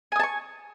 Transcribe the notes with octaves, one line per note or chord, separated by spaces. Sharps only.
G#5 A5 C#6 D#6